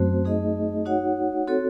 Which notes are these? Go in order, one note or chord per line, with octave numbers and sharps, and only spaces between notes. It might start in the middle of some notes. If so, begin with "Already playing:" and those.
Already playing: F#2 A3 C4 F#4 C5
A3 D#4 G#4 D#5
D#4 F#4 C#5 F#5
C4 F#4 A4 C#5